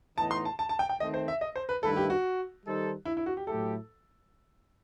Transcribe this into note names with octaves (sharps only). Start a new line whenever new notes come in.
A2 E3 B3 D#4 A5
C6
A5
A5
A5
G5
G5
D#3 A3 C4 D#5
C5
E5
D#5
C5
B4
G2 D#3 A3 E4 A4 B4
G4
F#4
D#3 G3 D#4 A4 C5
E4
E4
F#4
G4
A2 F#3 A3 E4 G4 A4